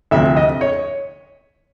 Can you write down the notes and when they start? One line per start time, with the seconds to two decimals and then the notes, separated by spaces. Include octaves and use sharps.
0.11 D2 C3 F3 E5
0.37 D#5
0.61 C#5